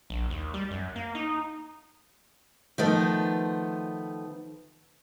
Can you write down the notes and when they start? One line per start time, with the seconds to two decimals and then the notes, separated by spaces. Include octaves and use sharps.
0.10 A#1
0.30 D#2
0.54 G3
0.71 F#2
0.96 A#3
1.15 D#4
2.78 D#3 F3 A3 B3